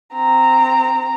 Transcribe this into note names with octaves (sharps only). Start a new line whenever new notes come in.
C4 A#5